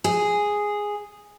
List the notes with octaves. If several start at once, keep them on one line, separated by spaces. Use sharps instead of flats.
G#4